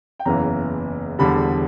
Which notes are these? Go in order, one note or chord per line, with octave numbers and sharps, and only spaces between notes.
G5
F#1 E2 C#3 E3 A#5
E1 E2 D3 G3 B5